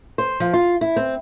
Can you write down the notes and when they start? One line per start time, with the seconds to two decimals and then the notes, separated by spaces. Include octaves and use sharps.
0.18 C5
0.40 F3
0.53 F4
0.81 E4
0.96 C4